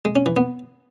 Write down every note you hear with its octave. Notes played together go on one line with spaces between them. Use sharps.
G#3
C#4
E3
B3